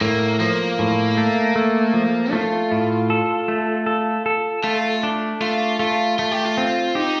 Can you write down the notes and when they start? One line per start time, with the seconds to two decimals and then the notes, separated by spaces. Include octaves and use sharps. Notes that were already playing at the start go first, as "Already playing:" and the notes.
0.01 A2 A#3
0.40 F3 A#3
0.79 A2
1.17 A3
1.56 A3
1.94 F3
2.33 A3 F4
2.72 A2
3.10 A4
3.48 A3
3.86 A4
4.26 A4
4.64 A3 F4
5.03 D4
5.41 A3 F4
5.80 A3 F4
6.18 A3 F4
6.31 G4
6.45 F4
6.58 C4
6.95 D#4 G4